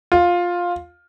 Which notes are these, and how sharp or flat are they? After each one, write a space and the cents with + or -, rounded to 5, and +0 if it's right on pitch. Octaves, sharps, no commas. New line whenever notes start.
F4 +10